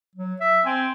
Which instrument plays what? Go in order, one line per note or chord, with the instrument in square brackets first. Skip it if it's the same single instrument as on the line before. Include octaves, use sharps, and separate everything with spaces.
[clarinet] F#3
E5
[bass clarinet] C4 [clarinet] G#5